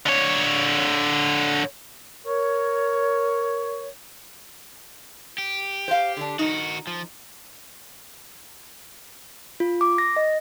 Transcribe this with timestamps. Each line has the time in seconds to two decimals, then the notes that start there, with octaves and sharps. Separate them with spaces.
0.06 D3 C#5
2.26 A#4 C#5
5.38 G4
5.88 C5 F5
6.17 D3 D4
6.39 D#3 D#4 F#4
6.87 F3
9.60 F4
9.81 D6
9.98 A#6
10.16 D#5